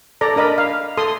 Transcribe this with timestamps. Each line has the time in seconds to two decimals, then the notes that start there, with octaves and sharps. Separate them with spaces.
0.21 A4 D5 A#5
0.36 D4 A#4 D#5 B5
0.58 F5
0.97 A4 C6 D#6